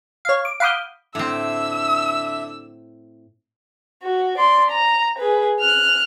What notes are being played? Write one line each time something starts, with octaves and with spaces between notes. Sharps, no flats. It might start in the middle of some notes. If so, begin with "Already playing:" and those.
C#5 F5
D6
F5 F#5 B5 D6 D#6 G6
A2 D3 C4 E5 E6
F#4
D5 C6
A#5
G#4 B4
F6 F#6